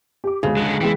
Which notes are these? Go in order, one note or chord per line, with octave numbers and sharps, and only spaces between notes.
G4 D6
D2 C#3 G#3
D3 G#3 F#6
E3 G#3 G5 B6